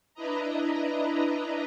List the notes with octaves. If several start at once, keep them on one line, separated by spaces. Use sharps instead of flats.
D4 E4 B4 D#5 A#5